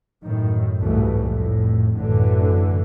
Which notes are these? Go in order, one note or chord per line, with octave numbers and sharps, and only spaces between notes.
F#2 A2 D#3
C2 G#2 B2 E3 G3 A3
F2 A2
A1 F#2 A2 D3 E3